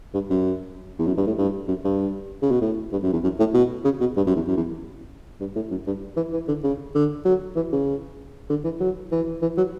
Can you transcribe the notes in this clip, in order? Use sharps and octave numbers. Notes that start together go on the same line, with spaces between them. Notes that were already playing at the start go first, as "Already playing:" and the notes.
G2
F#2
E2
F#2
G2
A2
G2
F#2
G2
C#3
B2
A2
G2
F#2
E2
F#2
A2
B2
C#3
B2
G2
F#2
E2
F#2
E2
G2
A2
F#2
G2
E3
E3
D3
C#3
D3
F#3
E3
C#3
D3
E3
F#3
E3
E3
F#3